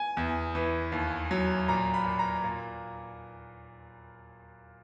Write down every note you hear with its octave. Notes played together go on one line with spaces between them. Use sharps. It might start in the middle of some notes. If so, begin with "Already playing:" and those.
Already playing: G#5
E2
E3
D#2
F#3
A#2 A#5
B5
A#2
A#5
A#2